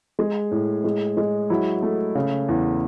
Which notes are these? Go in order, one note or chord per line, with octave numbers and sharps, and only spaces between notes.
G#3 G#4
A2
G#3
G#3
F#3 E4
A3
C#3
E2